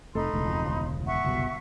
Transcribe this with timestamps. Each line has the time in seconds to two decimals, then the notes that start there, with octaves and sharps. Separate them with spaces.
0.15 F1 A3 D#4 A4 B5 C6
0.33 E1 C#2
0.45 F2
0.65 G1
1.06 E5 F#5 C#6
1.24 F#1 C2 B2